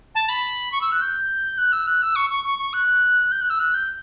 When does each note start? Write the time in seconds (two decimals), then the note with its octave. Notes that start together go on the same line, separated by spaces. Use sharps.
0.14 A5
0.28 B5
0.72 C#6
0.81 E6
0.91 F#6
1.01 G6
1.57 F#6
1.72 E6
1.87 F#6
2.02 E6
2.15 C#6
2.29 C#6
2.44 C#6
2.58 C#6
2.73 F#6
3.31 G6
3.41 F#6
3.49 E6
3.59 F#6
3.74 G6